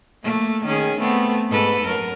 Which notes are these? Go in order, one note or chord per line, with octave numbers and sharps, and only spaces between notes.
A3 A#3
D#3 C#4 G#4
A3 B3 C4
G#2 A4 B4
F#2 A#4